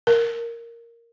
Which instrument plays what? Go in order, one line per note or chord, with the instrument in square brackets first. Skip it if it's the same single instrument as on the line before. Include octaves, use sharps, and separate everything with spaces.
[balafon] A#4